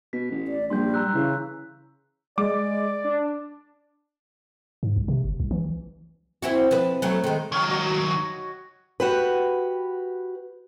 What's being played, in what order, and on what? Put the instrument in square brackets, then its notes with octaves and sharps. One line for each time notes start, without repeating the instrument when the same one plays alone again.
[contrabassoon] B2 [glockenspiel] B6
[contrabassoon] A1
[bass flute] D5
[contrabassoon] A#1 [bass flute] G3 [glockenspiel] C6 G6
[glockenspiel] A#5 E6 F#6
[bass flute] C#3 [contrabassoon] E3
[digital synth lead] G#3 [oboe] D5 [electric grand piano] D6
[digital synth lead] D4
[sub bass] G#2
C2
C3
G1
C2
E3
[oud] C4 E4 F#4
F3 B4
F#3 A3
D#3 G#3
[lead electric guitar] D#3 F#3 [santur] C#5 F5 G5
[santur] F#4 D#5
[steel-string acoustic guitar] F#4 G4 B4